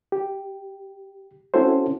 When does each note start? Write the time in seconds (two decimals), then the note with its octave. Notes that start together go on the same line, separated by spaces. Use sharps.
0.12 G4
1.54 C4 C#4 E4 F#4 A4 C5